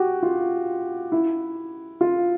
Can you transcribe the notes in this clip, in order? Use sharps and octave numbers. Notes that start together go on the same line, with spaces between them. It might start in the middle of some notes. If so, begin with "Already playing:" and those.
Already playing: F#4 G4
F4
E4
F4